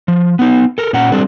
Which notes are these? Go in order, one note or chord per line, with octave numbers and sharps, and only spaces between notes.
F3
B3 D#4
A4 A#4
A#2 C#4 F#5 A#5
G3 C4 D4 A4